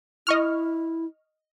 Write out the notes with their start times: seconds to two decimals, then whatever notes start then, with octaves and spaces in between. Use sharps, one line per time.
0.27 E4 D#5 C#6 F6